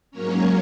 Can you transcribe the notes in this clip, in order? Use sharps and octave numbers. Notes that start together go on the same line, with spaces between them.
G#2 F#3 A#3 C#4 A#4 C#5